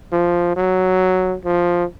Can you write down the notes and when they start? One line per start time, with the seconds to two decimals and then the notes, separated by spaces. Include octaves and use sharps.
0.12 F3
0.56 F#3
1.45 F3